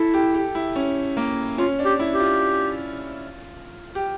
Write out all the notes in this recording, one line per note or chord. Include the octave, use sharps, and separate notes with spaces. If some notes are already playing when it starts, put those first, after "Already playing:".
Already playing: E4 A4
G4
G4
E4
C#4
A#3
C#4 F4
D4
G4
E4
G4
F4
G4